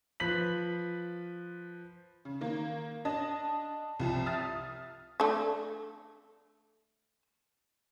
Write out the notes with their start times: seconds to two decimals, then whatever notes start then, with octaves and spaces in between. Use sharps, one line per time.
0.20 F3 B4 B6 F#7
2.25 C#3
2.41 D#3 A#3
3.05 D4 D#5 A5
4.00 C2 F3 A5
4.26 E5 D#6 F6 A6
5.20 A3 D4